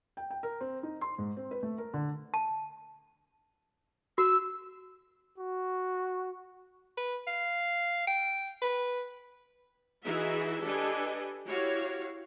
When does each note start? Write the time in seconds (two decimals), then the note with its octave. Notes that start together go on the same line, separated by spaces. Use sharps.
0.17 G5
0.30 G5
0.43 A#4
0.60 C4
0.83 D#4
1.01 C6
1.18 G#2
1.37 C4
1.51 B4
1.63 A3
1.78 A#4
1.94 D3
2.34 A5
4.18 F#4 E6
5.38 F#4
6.97 B4
7.27 F5
8.07 G5
8.62 B4
10.03 E3 D#4 E4 F#4 G#4 E5
10.63 D4 G4 A4 B4 D#5 G#5
11.47 E4 F#4 G4 C#5 F5